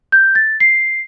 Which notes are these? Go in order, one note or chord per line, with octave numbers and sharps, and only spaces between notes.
G6
A6
C7